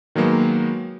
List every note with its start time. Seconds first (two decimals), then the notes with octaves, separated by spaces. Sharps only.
0.15 D#3 F#3 G#3 A#3 B3